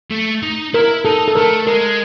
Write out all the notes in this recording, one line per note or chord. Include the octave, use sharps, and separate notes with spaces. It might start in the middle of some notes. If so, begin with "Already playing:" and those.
A3
D#4
E4 A#4
D#4 A4
A4
A3 A#4
G#3 A#4